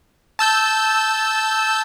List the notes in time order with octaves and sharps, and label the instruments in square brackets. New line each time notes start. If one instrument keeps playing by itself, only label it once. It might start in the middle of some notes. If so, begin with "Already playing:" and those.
[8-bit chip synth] A5 E6 G6